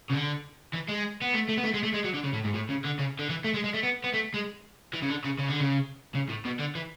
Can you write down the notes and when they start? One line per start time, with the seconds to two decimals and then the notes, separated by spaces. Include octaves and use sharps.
0.10 C#3
0.13 D3
0.73 E3
0.88 G#3
1.22 B3
1.34 A3
1.49 A3
1.57 B3
1.64 A3
1.74 G#3
1.83 A3
1.94 G#3
2.04 F#3
2.14 D3
2.24 C#3
2.33 A2
2.44 G#2
2.54 A2
2.69 C#3
2.84 D3
2.99 C#3
3.19 D3
3.30 E3
3.44 A3
3.54 G#3
3.64 G#3
3.74 A3
3.83 B3
4.04 B3
4.14 A3
4.34 G#3
4.94 E3
5.02 C#3
5.10 D3
5.24 C#3
5.39 C#3
5.50 D3
5.60 C#3
6.15 C#3
6.29 A2
6.45 B2
6.59 D3
6.75 E3